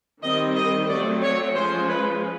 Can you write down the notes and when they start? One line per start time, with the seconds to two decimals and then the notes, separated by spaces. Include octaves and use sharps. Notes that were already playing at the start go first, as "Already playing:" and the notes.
0.23 D#3 G3 C4 D#5
0.56 D#5
0.89 F#3 A3 C4 D5
1.22 C#5
1.55 F3 G#3 C#4 C5
1.89 B4